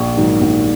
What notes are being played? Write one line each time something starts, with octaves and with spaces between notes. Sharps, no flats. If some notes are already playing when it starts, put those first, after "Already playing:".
Already playing: A#1 C#6
G#2 D#3 F#3
A#1